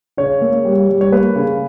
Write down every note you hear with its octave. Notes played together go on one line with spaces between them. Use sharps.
C#3 C#5
A#3
G3
G3
C#5
A#3 B4
C#3